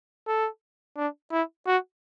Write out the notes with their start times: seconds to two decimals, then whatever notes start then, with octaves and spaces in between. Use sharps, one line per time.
0.27 A4
0.97 D4
1.32 E4
1.67 F#4